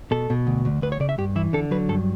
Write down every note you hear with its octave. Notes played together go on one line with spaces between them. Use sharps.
B2 A4
B2
D2
D2
D2 B4
C#5
C#3 D5
E5
G2 G4
E3 E4
D3 A4
F#3 B4
G2 A4